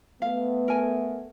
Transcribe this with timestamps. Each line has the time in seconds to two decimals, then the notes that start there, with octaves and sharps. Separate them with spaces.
0.22 A3 B3 F5
0.68 A#4 G#5